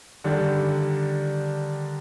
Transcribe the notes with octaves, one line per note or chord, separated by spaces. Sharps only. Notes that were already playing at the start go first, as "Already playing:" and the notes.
D3 D#3 G3 D4